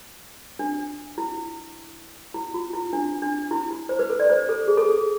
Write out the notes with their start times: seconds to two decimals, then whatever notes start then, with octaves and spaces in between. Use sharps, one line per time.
0.59 D4
1.18 E4
2.34 E4
2.54 F4
2.74 E4
2.93 D4
3.22 D4
3.51 E4
3.71 E4
3.89 C5
3.99 B4
4.10 A4
4.20 D5
4.30 C5
4.49 A4
4.68 G#4
4.77 A4
4.85 G#4